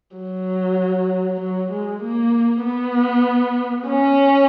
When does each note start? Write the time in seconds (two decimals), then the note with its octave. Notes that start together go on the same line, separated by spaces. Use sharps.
0.16 F#3
1.41 F#3
1.72 G#3
2.03 A#3
2.64 B3
3.88 C#4